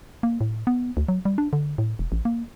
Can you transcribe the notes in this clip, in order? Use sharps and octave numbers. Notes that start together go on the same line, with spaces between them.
A#3
A2
B3
D2
F#3
G3
D4
D3
A2
E1
A1
A#3